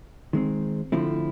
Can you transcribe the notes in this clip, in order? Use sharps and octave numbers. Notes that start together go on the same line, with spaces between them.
D#3 G#3 C4
D3 F3 A3 C4 E4